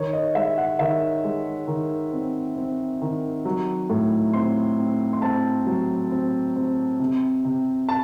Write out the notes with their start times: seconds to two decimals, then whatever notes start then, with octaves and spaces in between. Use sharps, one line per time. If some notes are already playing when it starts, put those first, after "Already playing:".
Already playing: D#3 C#5
0.13 D#5
0.35 G#3 E5
0.58 F#5
0.79 D#3 E5
1.24 G#3
1.68 D#3
2.12 C4
2.56 C4
3.02 D#3
3.45 F#3
3.90 A2
4.33 C4 C6
4.78 C4
5.13 C6
5.22 C4 A5
5.66 F#3
6.11 C4
6.56 C4
7.00 C3
7.44 C3
7.89 A5